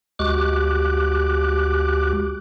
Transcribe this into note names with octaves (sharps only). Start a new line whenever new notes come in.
D2 G#3 F#4 G4 D6 F#6